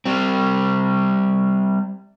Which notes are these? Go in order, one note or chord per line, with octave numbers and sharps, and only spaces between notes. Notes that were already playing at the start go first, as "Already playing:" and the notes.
G3 C4